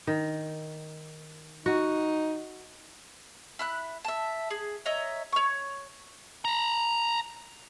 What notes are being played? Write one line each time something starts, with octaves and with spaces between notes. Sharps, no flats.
D#3
D#4 F#4
E4 B5 F#6
E5 A5
G#4
C#5 D#5 E5 A#5
C#5 C#6
A5 A#5